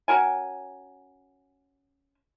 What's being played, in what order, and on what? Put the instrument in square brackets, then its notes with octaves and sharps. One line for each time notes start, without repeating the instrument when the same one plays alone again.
[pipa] C#4 F#4 A#4 G#5